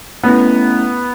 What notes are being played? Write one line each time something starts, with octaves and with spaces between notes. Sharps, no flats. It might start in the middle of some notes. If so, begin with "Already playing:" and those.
A3 B3 C#4 E4